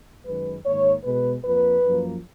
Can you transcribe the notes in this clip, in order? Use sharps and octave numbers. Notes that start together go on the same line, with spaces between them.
F#2 D#3 G#3 B4
G#2 D#3 A#3 C#5
B2 G#3 B4
F2 F3 A#3 B4
F#2 F3 A#3